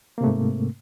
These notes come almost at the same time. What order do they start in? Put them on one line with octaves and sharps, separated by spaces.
A#3 C3 A3 G#2